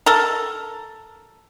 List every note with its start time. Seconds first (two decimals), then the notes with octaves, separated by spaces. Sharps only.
0.06 A4 A#4